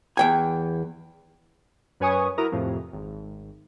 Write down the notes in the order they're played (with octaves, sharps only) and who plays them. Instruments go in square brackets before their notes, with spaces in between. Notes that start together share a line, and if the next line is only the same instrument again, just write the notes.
[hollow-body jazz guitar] E2 G5 G#5
[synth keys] F#2 B4 C#5 G#5 C#6 D#6
E4 F#4 A#4 A#5 D#6
F2 A2 C3
G#1